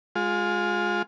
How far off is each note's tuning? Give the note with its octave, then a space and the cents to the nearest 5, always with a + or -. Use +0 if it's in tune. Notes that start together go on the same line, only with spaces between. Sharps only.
G#3 +0 F4 +25